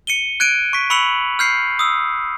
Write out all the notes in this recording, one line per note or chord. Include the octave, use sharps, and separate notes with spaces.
C#7 D#7 G7
F#6 G#6 D7 D#7
C#6 B6
B5 C#6 E6 C#7 F7 F#7
F6 G6 C7 C#7
D#6 E6